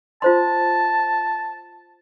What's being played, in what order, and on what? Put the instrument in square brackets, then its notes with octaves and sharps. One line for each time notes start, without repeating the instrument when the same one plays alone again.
[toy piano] F4 C5 C6 [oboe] A5